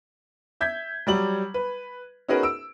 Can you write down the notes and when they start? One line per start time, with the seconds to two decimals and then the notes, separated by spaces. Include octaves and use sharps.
0.61 E5 G6 G#6 B6
1.07 F#3 G3 F#7
1.54 B4
2.28 C#4 D#4 F#4 G#4 A#4 B4
2.43 E6 D7